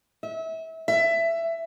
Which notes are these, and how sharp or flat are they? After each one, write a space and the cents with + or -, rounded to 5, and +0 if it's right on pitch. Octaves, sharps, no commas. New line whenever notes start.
E5 -30
E5 +15